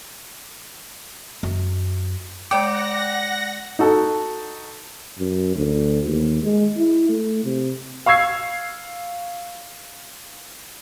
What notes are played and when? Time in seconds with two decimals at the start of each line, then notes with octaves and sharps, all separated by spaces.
1.43 F#2
2.51 G#3 D5 F#5 G5 D6 A#6 C#7
3.79 D#4 F#4 A4
5.19 F#2
5.55 D2
6.06 D#2
6.43 G#3
6.77 E4
7.09 A3
7.44 C3
8.06 F5 C#6 E6 G#6 C7